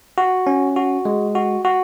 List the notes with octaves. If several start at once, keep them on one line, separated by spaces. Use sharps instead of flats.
F#4
C#4
F#4
G#3
F#4
F#4